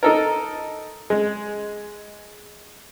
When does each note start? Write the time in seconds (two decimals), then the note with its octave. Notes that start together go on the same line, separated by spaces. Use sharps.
0.03 D#4 A4 A#4
1.10 G#3